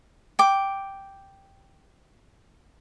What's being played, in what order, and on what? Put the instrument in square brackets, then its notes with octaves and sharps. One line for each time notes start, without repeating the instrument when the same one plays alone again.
[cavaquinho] G5 D6